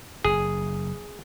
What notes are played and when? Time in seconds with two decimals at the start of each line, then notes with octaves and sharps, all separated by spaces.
0.25 F#1 G#4